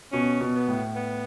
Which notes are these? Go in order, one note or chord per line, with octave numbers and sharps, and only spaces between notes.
B2 C#4
B2
B3
A2
B3